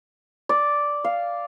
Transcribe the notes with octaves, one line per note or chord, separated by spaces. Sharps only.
D5
F5